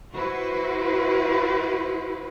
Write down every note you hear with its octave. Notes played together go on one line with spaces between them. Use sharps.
E4 F#4 B4 C5